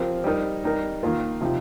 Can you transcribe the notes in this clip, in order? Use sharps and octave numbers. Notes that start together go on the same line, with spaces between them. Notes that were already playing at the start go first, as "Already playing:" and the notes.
Already playing: F3 C4 G4 A#4
G3 D#4 A#4
G3 D#4 A#4
D#3 A#3 F4 A#4
C3 F3 D#4 G4